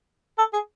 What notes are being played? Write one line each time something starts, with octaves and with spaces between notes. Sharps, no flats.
A4
G#4